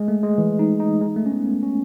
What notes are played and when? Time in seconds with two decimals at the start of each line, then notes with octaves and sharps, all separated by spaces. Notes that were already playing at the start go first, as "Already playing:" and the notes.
Already playing: G#3
0.08 A3
0.23 G#3
0.38 E3
0.59 D#4
0.80 D#4
1.01 G#3
1.16 A3
1.26 C#4
1.32 B3
1.46 B3
1.63 C#4